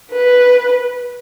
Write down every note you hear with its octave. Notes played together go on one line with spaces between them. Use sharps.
B4